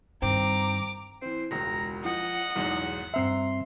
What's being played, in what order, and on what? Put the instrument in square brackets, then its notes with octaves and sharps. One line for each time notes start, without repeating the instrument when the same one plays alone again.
[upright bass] G2 D#3 [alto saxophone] C4 [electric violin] A#5 D6
[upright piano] E3 C4 [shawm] C5
[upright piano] E1 C#2 [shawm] A#5
[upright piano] F3 [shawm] D#5 [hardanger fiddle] F#5
[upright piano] B1 E2 G#2
[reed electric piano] G2 C4 E5 [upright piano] A#5 E6 C7 [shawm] C6